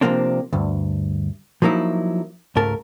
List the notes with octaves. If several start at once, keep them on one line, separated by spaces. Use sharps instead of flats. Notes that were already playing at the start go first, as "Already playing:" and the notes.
C3 E3 F3 A#3 C4 D4
D2 G2
F3 F#3 A#3 D#4 E4
C#2 G#2 A3 A#4 A5